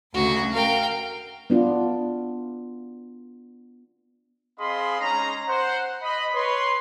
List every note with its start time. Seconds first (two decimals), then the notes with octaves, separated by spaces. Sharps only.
0.14 D2 C#3 F#4
0.52 A#4 F5 G5
1.50 B3 D4 F4
4.59 C4 G#4 D#5 F5 B5 C6
5.01 G#3 C#4 D#4 A#5
5.49 C5 F#5
6.03 D#5 B5
6.34 B4 C#5 C6